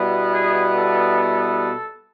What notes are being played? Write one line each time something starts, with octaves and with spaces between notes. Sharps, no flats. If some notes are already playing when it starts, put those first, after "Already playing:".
Already playing: B2 G3 B3 E4
G#4
A4